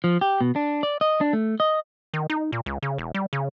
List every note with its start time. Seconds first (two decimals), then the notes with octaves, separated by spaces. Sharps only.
0.04 F3
0.21 G4
0.41 B2
0.56 D4
0.83 D5
1.01 D#5
1.21 D4
1.33 A3
1.60 D#5
2.14 D#3
2.30 D#4
2.52 A#2
2.66 C#2
2.83 C#3
2.98 E1
3.14 G3
3.33 C#3